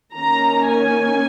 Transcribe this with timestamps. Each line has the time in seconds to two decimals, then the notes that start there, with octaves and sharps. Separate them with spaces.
0.14 D#3 A#3 C#4 A#5
0.69 G#5